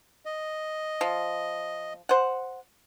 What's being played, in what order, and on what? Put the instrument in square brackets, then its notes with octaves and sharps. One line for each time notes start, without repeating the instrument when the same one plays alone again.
[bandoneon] D#5
[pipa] F3
C5 F#5